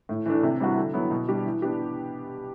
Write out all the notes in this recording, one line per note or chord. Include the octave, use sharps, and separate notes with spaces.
A2
E3 A3 D4
C3
E3 G3 D4 F#4
D3
F#3 B3 E4
B2
G3 D4 G4
E3
B3 D4 G4